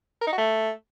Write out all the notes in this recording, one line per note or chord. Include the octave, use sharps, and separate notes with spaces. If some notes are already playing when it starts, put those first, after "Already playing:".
A#4
D#4
F#4
A3